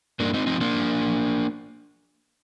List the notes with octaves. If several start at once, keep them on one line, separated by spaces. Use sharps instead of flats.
G2 A#3 D4
C4 D#4
F3 C4 D#4
A#3 D4
G2
F3